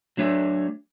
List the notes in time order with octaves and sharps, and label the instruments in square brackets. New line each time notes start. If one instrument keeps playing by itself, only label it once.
[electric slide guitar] F#3 A3 D4 C#5 E5